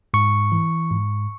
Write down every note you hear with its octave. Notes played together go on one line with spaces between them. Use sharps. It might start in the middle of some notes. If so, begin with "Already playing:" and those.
G#2 C#6
E3
G#2